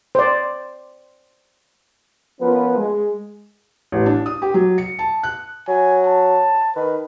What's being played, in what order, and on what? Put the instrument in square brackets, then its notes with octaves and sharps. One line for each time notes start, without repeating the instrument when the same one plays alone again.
[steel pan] C5 D5
[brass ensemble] F3 B3 C#4 F4 A#4 B4
G#3
[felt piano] A1
D4
D#6
G4
F#3
C#7
A5
F#6
[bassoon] F#3 [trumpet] G#5
[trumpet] A5
[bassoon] D#3 [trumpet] B4